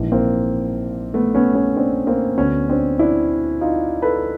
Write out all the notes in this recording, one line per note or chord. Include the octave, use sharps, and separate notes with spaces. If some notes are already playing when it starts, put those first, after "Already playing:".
Already playing: A#1 G#2 E3
A#3 C4
A3 B3
B3 C#4
B3 C#4
C4 D4
A#3 C4
D2 D3 B3 C#4
C4 D4
D4 E4
D#4 F4
A4 B4